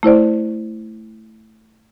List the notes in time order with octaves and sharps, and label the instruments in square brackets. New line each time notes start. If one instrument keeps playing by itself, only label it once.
[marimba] A3 E4 C5 D5